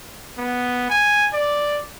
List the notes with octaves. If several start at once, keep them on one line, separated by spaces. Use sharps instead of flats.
B3
G#5
D5